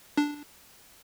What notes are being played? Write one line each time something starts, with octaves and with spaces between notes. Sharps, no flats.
D4